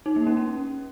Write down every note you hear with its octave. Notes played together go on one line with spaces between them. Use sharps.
D#4
A#3
C#4
C#4